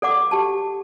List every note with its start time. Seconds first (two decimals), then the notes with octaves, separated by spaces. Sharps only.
0.02 A4 D5 F#5 D6
0.31 G4 A5